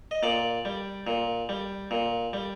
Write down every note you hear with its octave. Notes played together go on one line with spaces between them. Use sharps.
D#5
A#2 D5
G3
A#2
G3
A#2
G3